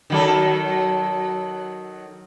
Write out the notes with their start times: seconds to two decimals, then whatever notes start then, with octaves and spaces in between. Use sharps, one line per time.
0.10 D#3 F#3 A4